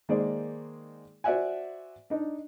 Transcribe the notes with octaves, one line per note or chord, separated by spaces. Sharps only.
D#3 G#3 A#3 G#4 C5 D5
F#4 C5 D5 E5 F#5 G#5
D4 D#4